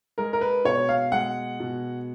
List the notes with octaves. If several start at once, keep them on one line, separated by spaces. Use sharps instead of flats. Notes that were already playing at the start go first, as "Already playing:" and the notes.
G#3 A#4
A#4
B4
B2 C#5
F5
G#3 F#5
B2